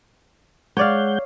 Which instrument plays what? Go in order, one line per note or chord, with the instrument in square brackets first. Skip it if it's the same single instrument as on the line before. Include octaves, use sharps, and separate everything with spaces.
[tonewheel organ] G#3 F#5 G6 [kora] C#5 D5 F5